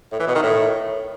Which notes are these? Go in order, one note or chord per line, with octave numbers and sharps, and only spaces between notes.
A2
E3
B2
D#3
A2